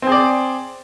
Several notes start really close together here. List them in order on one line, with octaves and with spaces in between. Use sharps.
C4 G#4 D5